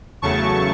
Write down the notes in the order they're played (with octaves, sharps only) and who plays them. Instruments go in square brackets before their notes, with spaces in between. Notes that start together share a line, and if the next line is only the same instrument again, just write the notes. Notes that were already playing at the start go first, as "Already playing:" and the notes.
[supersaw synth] E2 C#3 F#3 A3 A5 C#6